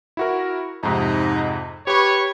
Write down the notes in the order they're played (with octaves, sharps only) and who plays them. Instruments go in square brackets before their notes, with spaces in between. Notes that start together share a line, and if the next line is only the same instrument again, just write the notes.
[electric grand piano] E4 F#4 A#4
[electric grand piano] F2 G#2 C3 [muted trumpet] D#4
[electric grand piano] G4 C#6 [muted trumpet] B4 [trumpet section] C#5